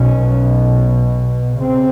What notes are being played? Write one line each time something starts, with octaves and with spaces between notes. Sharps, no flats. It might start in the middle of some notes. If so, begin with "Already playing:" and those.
Already playing: B1 B2 C#4
C#3 C4